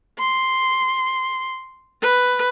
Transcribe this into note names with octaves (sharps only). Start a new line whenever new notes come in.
C6
B4